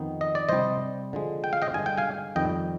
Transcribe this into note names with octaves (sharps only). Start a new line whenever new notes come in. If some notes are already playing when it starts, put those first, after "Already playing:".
Already playing: F2 D#3 B3 D#4
D#5
D5
C3 G3 D4 C5 D#5
D3 F3 G#3
G5
F5
D#5 G5
G2 D3 G#3 G#5
G5
F5 G#5
F2 D#3 G3 D#5 G5